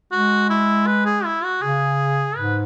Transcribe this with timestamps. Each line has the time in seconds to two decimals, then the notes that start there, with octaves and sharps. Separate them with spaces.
0.12 G#3 F#4
0.50 E4
0.87 B4
1.06 G#4
1.25 E4
1.44 F#4
1.62 C#3 G#4
2.37 G#2 B4